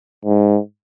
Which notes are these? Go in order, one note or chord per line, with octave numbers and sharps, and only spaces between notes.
G#2